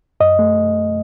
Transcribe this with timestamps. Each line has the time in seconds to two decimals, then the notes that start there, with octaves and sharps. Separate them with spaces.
0.20 F#2 D#5
0.39 A3